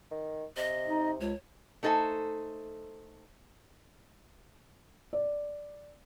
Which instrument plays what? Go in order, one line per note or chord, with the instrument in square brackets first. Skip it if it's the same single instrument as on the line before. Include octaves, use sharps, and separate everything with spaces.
[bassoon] D#3
[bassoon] C3 [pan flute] D#5
[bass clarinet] D#4
[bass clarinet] C#2 [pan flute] C#5
[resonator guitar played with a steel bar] A3 D#4 A4 C5 G#5
[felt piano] D5